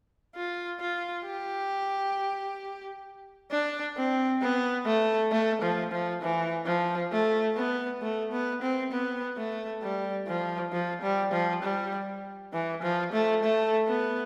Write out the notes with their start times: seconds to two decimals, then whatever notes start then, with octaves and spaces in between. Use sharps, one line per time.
0.35 F4
0.81 F4
1.26 G4
3.51 D4
3.96 C4
4.42 B3
4.86 A3
5.32 A3
5.62 F3
5.92 F3
6.22 E3
6.66 F3
7.12 A3
7.56 B3
8.02 A3
8.32 B3
8.62 C4
8.92 B3
9.37 A3
9.82 G3
10.27 F3
10.72 F3
11.02 G3
11.32 F3
11.63 G3
12.53 E3
12.83 F3
13.13 A3
13.43 A3
13.87 B3